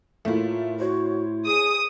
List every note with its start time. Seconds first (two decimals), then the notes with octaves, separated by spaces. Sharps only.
0.25 A2 A3 A#3 E4 F4
0.80 F#4 C5 C#5
1.46 G#4 D#6